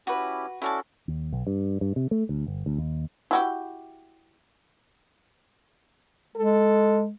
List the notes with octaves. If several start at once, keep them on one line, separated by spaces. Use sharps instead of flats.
C#4 E4 F#4 G4 B4
C#4 E4 F#4 A4 D5 A5
D#2
B1
G2
G2
C3
A3
D2
G1
D2
D#2
E4 F#4 G4
G#3 A4